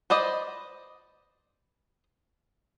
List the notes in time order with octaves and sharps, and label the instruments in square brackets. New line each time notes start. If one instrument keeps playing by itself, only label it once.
[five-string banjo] B4 C5 D5 D#5